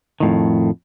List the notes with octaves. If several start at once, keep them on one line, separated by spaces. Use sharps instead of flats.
F2 A2 D#3